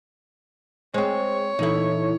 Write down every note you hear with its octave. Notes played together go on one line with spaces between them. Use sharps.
G#3 C4 C5 C#5
A#2 E3 D#4 E4 A4